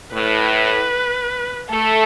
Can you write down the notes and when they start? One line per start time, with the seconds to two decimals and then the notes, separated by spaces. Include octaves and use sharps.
0.13 A2 B4
1.69 A3 A4